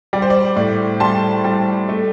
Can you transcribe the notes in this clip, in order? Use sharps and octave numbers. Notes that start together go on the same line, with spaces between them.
G3 D5
C5
D5
A2 D5
G3 A5 C6
G3
A3